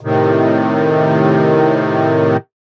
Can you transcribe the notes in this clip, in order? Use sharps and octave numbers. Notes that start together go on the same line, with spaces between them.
A2 C3 D#3